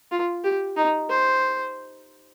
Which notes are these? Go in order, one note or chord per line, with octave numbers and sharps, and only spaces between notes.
F4
G4
D#4
C5